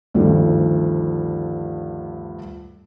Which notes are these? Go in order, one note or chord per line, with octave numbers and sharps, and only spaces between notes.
D2 G2 D#3 F3